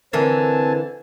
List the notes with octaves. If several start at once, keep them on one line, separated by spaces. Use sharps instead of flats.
D3 E3 C4 A#4 G#5 A5